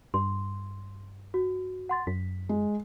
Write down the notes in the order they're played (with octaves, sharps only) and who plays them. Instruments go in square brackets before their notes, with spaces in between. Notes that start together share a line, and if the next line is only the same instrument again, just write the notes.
[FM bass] G2 [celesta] C6
[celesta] F#4
F#5 C6 A6
[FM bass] F#2 [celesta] B6
[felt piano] G#3